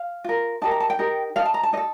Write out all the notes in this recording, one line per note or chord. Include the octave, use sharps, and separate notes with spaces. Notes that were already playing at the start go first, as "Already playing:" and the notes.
Already playing: F5
F4 A#4
D#4 G4 A#4 A5
A#5
A5
G5
D#4 G4 A#4
D#4 A4 F5
A5
A#5
A5
D#4 A4 D#5